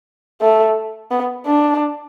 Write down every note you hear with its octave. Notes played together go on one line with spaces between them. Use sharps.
A3
B3
D4